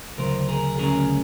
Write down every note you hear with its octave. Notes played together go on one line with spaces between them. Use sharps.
D2 C#3 F#3 A#4 C5
G#4 A#4
D2 C#3 F#3 G#4 A#4